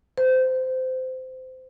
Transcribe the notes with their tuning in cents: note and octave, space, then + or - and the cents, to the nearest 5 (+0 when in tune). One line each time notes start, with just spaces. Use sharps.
C5 -20